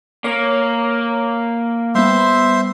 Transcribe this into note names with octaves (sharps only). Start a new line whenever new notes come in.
A#3 C#5
G3 B3 C5 E5 C6